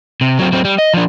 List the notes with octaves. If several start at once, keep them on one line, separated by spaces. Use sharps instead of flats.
C3
F#3 C4
F#3 C4
G3
D#5
F3 D4